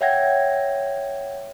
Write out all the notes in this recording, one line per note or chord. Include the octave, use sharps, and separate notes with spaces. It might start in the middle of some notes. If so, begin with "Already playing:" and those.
C#5 E5 F#5 G5 G#6 A#6